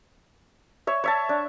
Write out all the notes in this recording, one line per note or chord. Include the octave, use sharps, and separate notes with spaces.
C#5 E5
C#5 E5 A5
D4